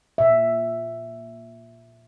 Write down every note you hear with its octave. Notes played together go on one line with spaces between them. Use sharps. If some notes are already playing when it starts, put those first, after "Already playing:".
A#2 E5